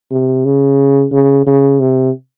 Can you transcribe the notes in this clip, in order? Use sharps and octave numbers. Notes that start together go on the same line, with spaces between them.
C3
C#3
C#3
C#3
C3